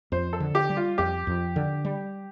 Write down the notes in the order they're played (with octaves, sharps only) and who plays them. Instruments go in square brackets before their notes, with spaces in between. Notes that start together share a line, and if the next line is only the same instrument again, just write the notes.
[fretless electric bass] F2 [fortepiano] C5
[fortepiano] A4
[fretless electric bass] D3
[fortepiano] G4
[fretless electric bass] G3
[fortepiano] F4
[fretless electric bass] F2 [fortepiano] G4
[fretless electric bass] F2
D3
G3